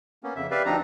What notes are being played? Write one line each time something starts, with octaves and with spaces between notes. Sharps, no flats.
A#3 B3 C#4
F2 C#3 E5
G4 B4 D5 E5 F5
D2 F3 C4 D4 D#4 A#5